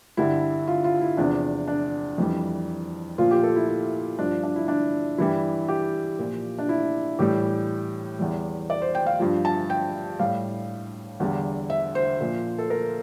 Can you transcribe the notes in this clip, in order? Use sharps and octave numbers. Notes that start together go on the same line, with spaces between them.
G2 D3 G3 E4
F4
F4
E4
E2 C3 F3 D4
D4
F2 E3 G3
A#2 F3 F4
G4
A4
E4
E4
G2 F3 D4
D4
E4
D4
G2 E3 G3 E4
G4
A#2 F3
D4
E4
A2 E3 G3 G4
E2 E3 G3
D5
C5
G5
F5
G2 F3
A5
G5
A2 G3 F5
E2 D3 G3
E5
C5
A#2 F3
A4
A#4